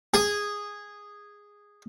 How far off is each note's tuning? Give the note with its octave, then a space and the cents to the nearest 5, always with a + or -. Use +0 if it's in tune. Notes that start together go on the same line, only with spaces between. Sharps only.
G#4 -10